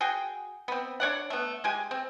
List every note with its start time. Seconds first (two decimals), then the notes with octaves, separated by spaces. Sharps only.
0.01 F#4 G#4 G5
0.68 B3 C4
1.00 D4 C#5 D5 F#5
1.30 A3 B3
1.64 G#3 G4 G#5
1.91 C4